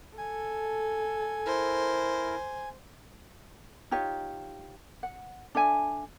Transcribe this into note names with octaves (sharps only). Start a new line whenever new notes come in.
A4 G#5
E4 A#4 C5
D#4 F4 G4 C#5
F#5
D4 A4 E5 G#5